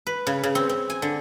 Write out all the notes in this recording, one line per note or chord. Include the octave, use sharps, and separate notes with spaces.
B4
C#3
C#3
C4
C4
G#5
D3